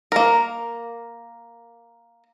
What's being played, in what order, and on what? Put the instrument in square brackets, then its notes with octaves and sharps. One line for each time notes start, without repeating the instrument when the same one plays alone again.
[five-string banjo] A#3 A#4